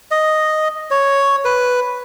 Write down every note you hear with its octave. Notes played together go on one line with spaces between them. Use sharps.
D#5
C#5
B4